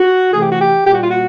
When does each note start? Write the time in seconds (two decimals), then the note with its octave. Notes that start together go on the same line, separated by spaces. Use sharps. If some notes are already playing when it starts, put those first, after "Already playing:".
Already playing: F#4
0.33 C3 E3 A3 G#4
0.42 G4
0.52 F#4
0.61 G4
0.86 A#2 G3 A#3 G4
0.94 F#4
1.03 F4
1.11 F#4